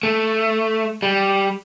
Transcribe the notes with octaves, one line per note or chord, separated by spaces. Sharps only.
A3
G3